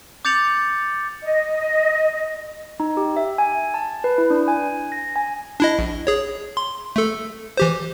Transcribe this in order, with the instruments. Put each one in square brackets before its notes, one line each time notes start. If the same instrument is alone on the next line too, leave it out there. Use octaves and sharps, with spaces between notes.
[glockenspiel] D6 G6 A6 C#7 F7 F#7
[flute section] D#5
[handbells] D#4
G4
E5
G#5
A5
B4
E4
D4
G#5
A#6
G#5
[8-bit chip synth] D4 E4 D#5
A#1
G#4 C#5
C6
A3 A4
E3 G4 C5